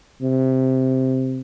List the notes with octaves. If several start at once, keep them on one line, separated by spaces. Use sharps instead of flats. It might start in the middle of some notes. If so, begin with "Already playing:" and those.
C3